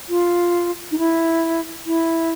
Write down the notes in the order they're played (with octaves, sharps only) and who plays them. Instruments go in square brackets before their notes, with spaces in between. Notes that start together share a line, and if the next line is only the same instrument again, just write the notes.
[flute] F4
D#4
E4
E4